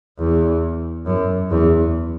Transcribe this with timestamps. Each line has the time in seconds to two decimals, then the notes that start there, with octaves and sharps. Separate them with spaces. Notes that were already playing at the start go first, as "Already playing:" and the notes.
0.19 E2
1.06 F#2
1.51 E2